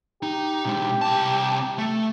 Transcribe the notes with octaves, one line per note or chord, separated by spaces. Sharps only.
D#4 G4
B2 G#3
C2 A5
A3